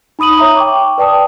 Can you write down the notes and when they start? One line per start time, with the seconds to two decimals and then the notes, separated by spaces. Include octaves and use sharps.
0.19 D#4 B5 D#6 D#7 F#7
0.38 C#5 E5 A#5 D#6
0.57 G5 C#6 D6
0.98 B4 D5 G5 A5 D#6